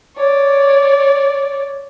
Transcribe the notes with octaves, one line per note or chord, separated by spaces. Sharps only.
C#5 D5